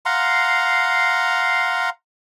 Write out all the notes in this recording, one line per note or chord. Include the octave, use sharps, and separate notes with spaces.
F5 F#5 A#5 C6